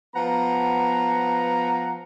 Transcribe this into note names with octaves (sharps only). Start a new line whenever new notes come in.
F3 B3 F#5 A#5